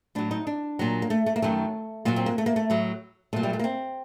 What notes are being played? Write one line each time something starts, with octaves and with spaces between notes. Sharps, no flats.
A2 F#3 D4
D#4
D4
A#2 F#3
A#3
A3
A3
A#3
F#2 D#3 F#3 A3
A#2 F#3 A#3
C4
A#3
A3
A#3
A3
A2 F#3
A#2 F#3 A3
G3
A3
A#3
C4